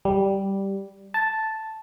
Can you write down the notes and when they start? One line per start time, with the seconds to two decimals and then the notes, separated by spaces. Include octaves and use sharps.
0.05 G3
1.14 A5